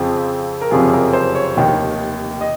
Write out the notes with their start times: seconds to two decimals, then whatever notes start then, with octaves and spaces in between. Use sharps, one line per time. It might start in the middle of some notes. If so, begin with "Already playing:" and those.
Already playing: F2 C#3 F3 C4
0.61 A#4
0.71 F#1 F2 C3 F3 G#4
0.93 A#4
1.13 C5
1.35 C#5
1.57 F1 D#2 D#3
2.41 D#5